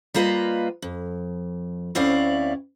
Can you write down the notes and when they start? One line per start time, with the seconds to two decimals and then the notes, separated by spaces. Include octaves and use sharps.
0.14 G3 A#3 F4 B4 D#5
0.82 F2
1.95 D2 C4 C#4 E4 D5 F5